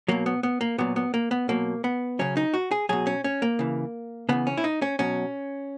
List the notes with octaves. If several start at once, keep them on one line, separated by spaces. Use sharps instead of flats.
B2 F#3 A#3
B3
B3
A#3
A#2 F#3 B3
B3
A#3
B3
B2 F#3 A#3
B3
C#3 F#3 C#4
D#4
F#4
G#4
B2 F#3 G#4
C#4
C#4
A#3
C#3 E3
C#3 E3 B3
C#4
E4
D#4
C#4
B2 F#3 C#4